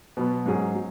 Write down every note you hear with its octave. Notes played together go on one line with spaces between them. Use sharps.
B2 F#3 B3
G#2 F#3 C#4 G#4
F#3